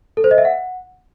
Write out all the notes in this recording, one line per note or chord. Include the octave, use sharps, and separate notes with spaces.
A4
C5
D#5
E5
F#5